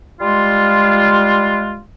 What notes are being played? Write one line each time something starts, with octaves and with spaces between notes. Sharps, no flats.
G3 G#3 F4